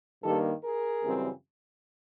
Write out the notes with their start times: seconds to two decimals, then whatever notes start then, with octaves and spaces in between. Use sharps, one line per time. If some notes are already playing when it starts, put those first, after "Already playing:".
0.24 G2 D#3 G3 A#3 G4 A4
0.63 G#4 A#4
1.02 F#2 C#3 E3 G3 C4